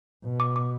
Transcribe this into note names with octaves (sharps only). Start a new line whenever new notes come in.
B2
D6
D6